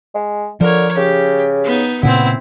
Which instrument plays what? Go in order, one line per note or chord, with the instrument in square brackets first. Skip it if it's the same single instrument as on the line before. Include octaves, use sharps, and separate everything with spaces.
[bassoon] G#3
[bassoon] D3 [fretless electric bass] F3 [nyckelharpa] A#4 C#5
[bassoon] C#3 [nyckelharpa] G4
[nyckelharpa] B3 D#4
[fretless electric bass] A#2 C#3 [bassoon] B3 [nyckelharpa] C4 E4